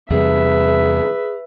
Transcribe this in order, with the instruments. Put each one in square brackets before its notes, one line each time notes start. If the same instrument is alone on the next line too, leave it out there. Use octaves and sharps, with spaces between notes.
[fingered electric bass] E2 C3 G3 [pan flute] G#4 [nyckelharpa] B4 E5